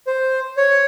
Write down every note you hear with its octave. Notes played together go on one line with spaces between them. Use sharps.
C5
C#5